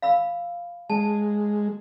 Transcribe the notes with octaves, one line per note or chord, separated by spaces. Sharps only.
F5 B5 E6
G#3 A5